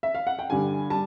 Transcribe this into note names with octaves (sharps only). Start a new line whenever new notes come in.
E5
F5
F#5
G5
G2 D3 G3 G#5
G3 A5